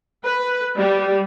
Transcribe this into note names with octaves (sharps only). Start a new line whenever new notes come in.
B4
G3